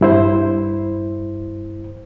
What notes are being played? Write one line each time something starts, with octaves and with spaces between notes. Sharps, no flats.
G2 E4 C5